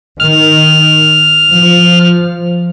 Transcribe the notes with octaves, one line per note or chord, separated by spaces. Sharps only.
D#3 F6
F3